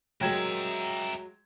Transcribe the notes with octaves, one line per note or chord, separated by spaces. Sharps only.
F#3 G#3 A#4 E5 G5 G#6